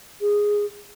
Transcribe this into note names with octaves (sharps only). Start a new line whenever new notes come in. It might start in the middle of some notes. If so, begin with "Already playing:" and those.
G#4